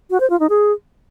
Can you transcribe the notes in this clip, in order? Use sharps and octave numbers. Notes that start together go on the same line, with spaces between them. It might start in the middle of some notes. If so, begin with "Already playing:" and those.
F#4
C5
F4
D#4
G#4